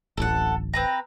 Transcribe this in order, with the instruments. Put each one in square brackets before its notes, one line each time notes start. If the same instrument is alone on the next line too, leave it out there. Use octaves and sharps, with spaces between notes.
[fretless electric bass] D1 A1 [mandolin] A4 F#5
[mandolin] C4 B4 A#5